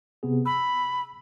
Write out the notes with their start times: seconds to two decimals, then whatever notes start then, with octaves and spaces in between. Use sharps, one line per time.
0.23 C3 B3 G#4
0.46 B5 E6